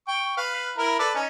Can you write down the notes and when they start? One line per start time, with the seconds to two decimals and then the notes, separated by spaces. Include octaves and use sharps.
0.08 G5 C#6
0.37 B4 F5
0.78 E4 A#4 A#5
0.99 A4 B4 D5
1.14 C#4 D#4